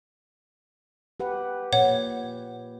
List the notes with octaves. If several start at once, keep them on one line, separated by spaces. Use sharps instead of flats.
G4 B4 F#5
A#2 C#5 F#5